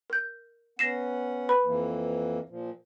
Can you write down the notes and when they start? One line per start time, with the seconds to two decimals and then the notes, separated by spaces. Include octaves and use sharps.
0.10 A#4 G6
0.79 B3 C#4 F#5 A#6 C7 E7
1.49 B4 B5
1.65 F2 E3 A#3
2.49 A#2 F3